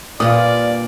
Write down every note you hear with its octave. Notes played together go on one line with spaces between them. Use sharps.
G2 A#2 F4 D5 D#6